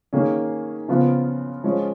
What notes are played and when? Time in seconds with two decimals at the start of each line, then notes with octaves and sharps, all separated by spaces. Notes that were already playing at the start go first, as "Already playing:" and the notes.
0.13 D#3 A#3 C#4 G#4
0.88 C#3 F3 B3 F4
1.64 F3 G#3 C#4 F4